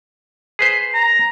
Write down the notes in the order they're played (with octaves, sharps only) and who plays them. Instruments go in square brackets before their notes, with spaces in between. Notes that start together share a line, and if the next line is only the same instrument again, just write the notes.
[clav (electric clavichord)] G#4 B4 C5
[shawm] A#5